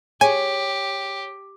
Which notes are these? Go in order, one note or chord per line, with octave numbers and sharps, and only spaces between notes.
G4 G#4 C#5 G#5